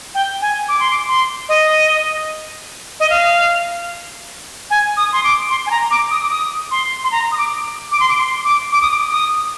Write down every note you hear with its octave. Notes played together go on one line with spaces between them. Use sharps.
G5
G#5
D6
C6
D6
C6
D#5
D#5
F5
G#5
D#6
C6
D6
C6
G#5
A#5
D6
D#6
D6
D#6
C6
C6
A#5
D#6
D6
D6
C6
D6
C6
D6
D6
D#6
D6
D#6